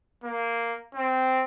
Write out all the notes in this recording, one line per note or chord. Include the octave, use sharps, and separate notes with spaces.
A#3
C4